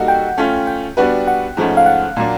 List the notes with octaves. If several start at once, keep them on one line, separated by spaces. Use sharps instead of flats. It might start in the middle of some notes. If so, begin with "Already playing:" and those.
Already playing: G3 A#3 D#4 F#4 A4 F#5
G5
A3 C#4 F4
G5
G3 B3 D4 F#4 B4
F#5
G#2 F3 A3 C#4
F5
F#5
A#2 F#3 A#3 D4